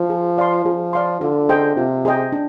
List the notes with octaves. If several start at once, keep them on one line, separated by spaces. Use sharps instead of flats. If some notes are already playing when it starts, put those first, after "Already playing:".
Already playing: F3
G#4
D5 F5 C6
F3 G#4
D5 F5 C6
D3 F4
G#4 C5 D#5 G5
C3 F4
G#4 C5 D#5 G5
D4